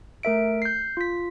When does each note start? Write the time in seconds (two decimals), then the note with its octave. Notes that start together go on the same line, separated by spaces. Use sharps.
0.23 A3 A#4 E5 D7
0.62 G6 C7
0.97 F4 B6